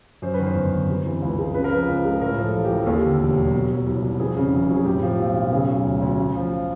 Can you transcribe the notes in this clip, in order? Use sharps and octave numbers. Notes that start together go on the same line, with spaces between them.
F#2 C5
B4
D#3
C5
G1
G1
C3
E3
C#2
G#3
C#3 B4
A#4
F3 B4
C#2
G#3
A2 A#4
F3 A4
A1
G4
A1
A4
D#2 G#4
D3
E1
F#3
B2
F#3
C2
C2
F2 G#4
C#3
F1
F#3 G#4
A2 G4
F3
B1
B1
C#3 G#4
F#3
D2
D2
C#3
F3